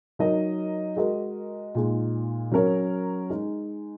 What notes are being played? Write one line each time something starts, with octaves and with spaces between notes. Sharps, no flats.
F#3 D#4 A#4 D#5
G#3 F#4 A#4 D#5
A#2 G#3 D#4
F#3 C#4 A#4 C#5
G#3 D#4 G#4